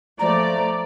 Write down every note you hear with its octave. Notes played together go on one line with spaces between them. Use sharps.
F3 A3 D5 A#5